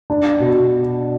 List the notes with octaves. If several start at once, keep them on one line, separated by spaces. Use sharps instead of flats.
D4
B2